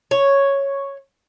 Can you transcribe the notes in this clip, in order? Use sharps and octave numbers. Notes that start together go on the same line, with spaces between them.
C#5